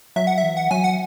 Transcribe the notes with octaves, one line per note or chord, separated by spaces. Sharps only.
F#3 E5
F#5
E5
E3
F#5
F#3 G#5
F#5